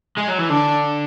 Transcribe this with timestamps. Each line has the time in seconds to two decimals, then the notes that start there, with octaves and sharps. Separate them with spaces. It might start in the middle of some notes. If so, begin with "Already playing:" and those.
0.18 G#3
0.29 F#3
0.39 E3
0.50 D3 D4